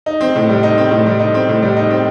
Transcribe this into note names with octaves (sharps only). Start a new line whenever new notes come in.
D#4
C4
A2
G3
D#4
C4
A2
G3
D#4
C4
A2
G3
D#4
C4